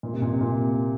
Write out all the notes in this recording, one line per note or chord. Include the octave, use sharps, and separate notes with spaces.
A#2
C3
A#2
C3
A#2